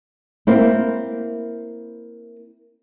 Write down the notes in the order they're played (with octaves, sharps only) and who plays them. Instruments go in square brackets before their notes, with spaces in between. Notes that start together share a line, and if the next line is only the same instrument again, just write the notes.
[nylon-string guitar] A#3 C4 E4